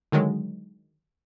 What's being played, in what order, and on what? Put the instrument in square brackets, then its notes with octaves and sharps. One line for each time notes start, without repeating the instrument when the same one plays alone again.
[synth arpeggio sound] D3 D#3 F#3 G#3